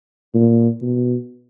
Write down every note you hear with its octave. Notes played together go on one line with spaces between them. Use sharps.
A#2
B2